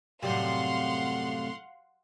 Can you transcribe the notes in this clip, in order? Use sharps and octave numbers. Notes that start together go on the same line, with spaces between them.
F#2 A2 C3 G3 F5 F#5 C6